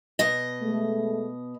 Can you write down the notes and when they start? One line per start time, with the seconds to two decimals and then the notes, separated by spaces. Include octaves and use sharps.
0.19 B2 D#5
0.62 G#3 A3